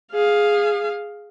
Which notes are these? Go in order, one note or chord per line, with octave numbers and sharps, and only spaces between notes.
G#4 F5